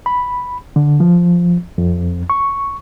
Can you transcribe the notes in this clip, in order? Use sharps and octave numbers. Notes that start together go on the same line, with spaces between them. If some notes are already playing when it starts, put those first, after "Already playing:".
B5
D3
F3
F2
C#6